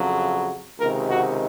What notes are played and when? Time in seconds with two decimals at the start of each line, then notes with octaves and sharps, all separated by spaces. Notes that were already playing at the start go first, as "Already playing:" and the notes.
Already playing: F2 C#3 F#3
0.79 C#2 C3 D#3 A#4
1.10 F#4